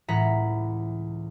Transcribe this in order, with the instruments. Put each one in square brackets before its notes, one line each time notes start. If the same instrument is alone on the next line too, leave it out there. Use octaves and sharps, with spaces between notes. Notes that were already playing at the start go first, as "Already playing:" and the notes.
[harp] C#2 A2 E3 F#5 A#5 B6